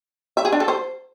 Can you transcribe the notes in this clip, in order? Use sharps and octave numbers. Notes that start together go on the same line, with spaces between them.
E5
G#4
D4
A4
C5